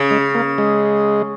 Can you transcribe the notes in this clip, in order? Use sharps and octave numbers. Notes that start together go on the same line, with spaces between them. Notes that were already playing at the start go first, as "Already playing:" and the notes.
Already playing: C#3
G#3
A#3
G#3